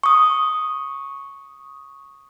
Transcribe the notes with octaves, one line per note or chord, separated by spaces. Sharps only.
C#6 D#6